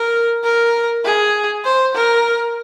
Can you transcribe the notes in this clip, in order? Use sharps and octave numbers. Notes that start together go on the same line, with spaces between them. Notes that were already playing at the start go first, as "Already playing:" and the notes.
Already playing: A#4
A#4
G#4
C5
A#4